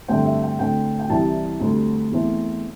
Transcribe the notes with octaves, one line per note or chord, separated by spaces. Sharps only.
G2 D3 A3 C4 G5
E5
G5
D2 D3 C4 G5
G5
C2 C3 E3 G3 C4 A5
D2 D3 G3 C4
E2 E3 A3 C4